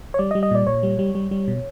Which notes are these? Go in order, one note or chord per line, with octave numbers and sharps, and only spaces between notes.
C#5
G3 D5
D#5
G3
D#5
A#2 D5
A#2 C#5
G3
G3
G3
G3
B2